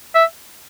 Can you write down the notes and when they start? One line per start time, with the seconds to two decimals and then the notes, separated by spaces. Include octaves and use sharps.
0.15 E5